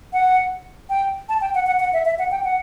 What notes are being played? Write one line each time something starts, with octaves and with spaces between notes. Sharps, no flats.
F#5
G5
A5
G5
F#5
F#5
F#5
E5
E5
F#5
G5
F#5